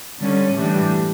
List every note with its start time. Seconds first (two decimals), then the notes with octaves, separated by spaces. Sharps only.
0.20 D3 G3 C#4
0.54 A2 E3 G3 D4